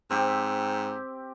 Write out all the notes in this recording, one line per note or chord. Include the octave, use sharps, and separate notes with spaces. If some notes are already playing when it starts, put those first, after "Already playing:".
G#2 C4 G4